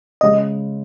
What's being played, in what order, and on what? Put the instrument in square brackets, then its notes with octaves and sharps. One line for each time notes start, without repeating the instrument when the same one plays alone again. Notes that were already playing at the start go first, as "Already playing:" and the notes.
[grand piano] C#3 G#3 [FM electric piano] D#5